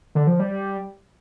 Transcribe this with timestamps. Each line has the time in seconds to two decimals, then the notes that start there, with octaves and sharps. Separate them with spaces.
0.15 D3
0.27 F3
0.40 G3